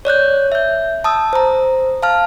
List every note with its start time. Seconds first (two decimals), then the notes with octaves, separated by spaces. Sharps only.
0.05 C#5 D5 F#6 G6
0.52 E5 G6
1.04 A5 D#6 E6
1.33 C5 A#5
2.02 F5 A5 F6